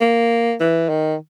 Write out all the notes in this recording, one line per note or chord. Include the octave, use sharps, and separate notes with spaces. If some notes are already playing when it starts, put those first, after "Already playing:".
A#3
E3
D#3